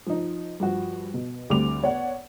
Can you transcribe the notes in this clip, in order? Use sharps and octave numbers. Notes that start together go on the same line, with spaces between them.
F3 D#4
G2 F3 F#4
B2
D2 D3 G3 C4 D6 F7
B3 C#5 D5 F#5